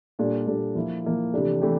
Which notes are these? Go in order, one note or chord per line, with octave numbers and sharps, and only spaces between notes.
A#2 G3 D4 A4
A#2 G3 D4 A4
F3 A#3 E4
F3 A#3 E4
C3 E3 A3 D4 G4
C3 E3 A3 D4 G4